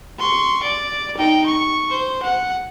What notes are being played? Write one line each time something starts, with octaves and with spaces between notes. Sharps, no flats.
C6 C#6
D5
D#4 G5
C#6
C5
F#5